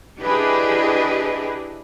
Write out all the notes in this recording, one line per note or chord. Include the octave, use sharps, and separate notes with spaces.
D4 E4 G4 G#4 B4 D#5